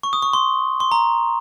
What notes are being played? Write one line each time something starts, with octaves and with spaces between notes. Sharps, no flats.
C#6
D#6
C#6
C6
C6
A#5